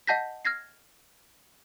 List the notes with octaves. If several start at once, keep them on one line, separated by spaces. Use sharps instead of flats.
D#5 F#5 A5 G6 A#6 B6
F6 G#6 A#6 C7